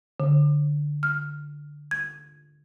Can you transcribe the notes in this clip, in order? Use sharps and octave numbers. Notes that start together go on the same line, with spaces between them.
D3
F6
G#6